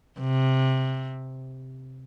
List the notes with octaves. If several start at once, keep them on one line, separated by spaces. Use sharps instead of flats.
C3